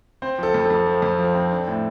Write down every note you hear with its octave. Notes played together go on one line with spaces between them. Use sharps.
C4 C5
F3 A4
F2
A4
F2
F3
F2
F3
C4
D4
A2